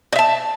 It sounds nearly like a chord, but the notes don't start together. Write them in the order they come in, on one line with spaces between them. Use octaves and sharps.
D#5 E5 A5